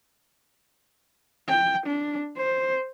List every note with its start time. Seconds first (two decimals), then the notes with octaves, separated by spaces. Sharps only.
1.48 G5
1.86 D4
2.37 C5